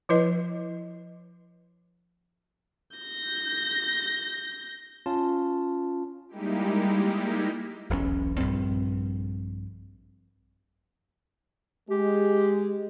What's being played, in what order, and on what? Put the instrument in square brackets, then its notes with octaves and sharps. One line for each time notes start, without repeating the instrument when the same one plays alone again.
[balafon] F3 E4 B4 D#5
[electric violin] G6 A#6
[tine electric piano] C#4 F4 A5
[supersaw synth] G3 G#3 A#3 D#4 E4 G4
[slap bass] E1 B1 E2 C#4
A#1 G2 C4
[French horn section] G#3 [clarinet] G4